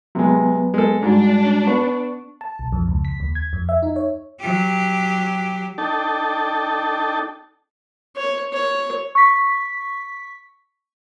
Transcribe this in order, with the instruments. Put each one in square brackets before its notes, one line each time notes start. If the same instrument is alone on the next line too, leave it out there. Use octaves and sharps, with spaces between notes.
[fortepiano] C3 G#3 [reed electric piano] F#3 B3 B4
[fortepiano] G#3 A4
[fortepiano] G#2 [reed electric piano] G3 G#3 F#4 [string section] D4
[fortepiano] B3 [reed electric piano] C#6
[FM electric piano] A5
B1
F2
C#2
B6
D#2
G#6
F2
E5
D#4
C#5
[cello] F#3 G4
[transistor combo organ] D4 D#4 A4 G5 A5
[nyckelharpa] C#5
C#5
[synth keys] C#6 B6